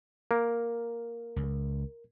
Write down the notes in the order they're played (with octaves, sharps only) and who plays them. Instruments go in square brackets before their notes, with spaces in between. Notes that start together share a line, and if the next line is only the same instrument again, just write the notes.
[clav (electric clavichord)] A#3 [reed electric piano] A#4
[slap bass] C#2